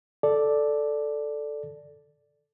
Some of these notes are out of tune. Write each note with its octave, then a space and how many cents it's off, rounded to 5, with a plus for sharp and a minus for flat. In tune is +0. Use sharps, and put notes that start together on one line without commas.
A4 +0 D5 +0